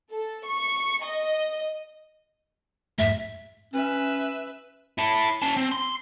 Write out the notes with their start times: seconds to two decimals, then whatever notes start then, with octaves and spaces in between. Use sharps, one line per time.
0.10 A4
0.45 C#6
1.03 D#5
2.98 F2 G#2 A3 E5
3.73 C#4 B4 E5
4.98 E4 A5
5.42 C#4 A5
5.57 C4
5.72 C6